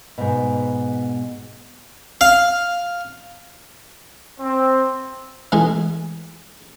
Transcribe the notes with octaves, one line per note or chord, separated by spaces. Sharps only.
G#2 B2
F5
C4
B2 E3 G#3 A3 F4 G#4